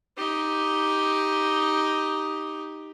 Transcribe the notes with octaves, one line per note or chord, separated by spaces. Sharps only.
D#4 G4